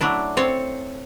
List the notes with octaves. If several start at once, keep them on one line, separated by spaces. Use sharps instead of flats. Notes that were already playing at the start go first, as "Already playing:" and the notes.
F#3 A3 D4 E4
C4 A4 C#5 A5